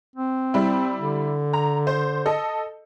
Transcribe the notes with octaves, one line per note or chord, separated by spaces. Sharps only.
C4
G3 E4
D3
A#5
C5
A4 D#5